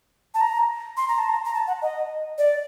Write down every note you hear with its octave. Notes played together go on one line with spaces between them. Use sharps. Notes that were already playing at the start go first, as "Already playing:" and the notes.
A5
A#5
C6
A#5
A5
A#5
A#5
A5
F#5
D#5
D5